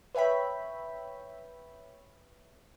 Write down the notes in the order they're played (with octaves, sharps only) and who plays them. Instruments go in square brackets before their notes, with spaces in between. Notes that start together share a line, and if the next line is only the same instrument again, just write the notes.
[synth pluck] B4 C#5 E5 G5 B5